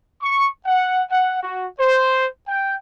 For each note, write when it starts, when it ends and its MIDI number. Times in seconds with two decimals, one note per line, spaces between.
0.22 0.48 85
0.65 1.01 78
1.10 1.37 78
1.42 1.65 66
1.79 2.25 72
2.47 2.74 79